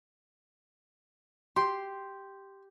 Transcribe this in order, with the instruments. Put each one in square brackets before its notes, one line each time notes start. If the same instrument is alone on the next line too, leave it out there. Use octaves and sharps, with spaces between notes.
[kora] G4 [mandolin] C6